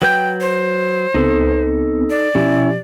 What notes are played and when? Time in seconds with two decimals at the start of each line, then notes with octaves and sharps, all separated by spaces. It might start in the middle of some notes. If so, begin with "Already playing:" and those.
0.02 F#3 B4 G5 G6
0.41 C5
1.14 C#2 B3 C4 D#4 A4
2.10 D5
2.35 B2 F3 C#4 E4 G4